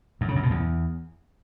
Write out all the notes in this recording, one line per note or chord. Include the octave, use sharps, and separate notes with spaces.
F#2
C#3
F#2
B2
E2